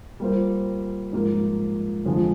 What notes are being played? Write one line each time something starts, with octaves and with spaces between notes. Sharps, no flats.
G3 A#3 F4 C5
G#2 F3 A#3 F4
F2 D3 F3 G#3